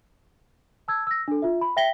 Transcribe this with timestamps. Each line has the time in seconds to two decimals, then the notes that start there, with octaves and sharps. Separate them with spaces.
0.88 A5 E6 G#6
1.07 E6 A#6
1.28 D4 A4
1.42 F4 E5
1.61 B5
1.76 E5 G5 A#6 B6 G7